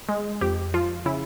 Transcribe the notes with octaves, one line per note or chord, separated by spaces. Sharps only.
G#3
F2 G4
F3 F4
C#3 E4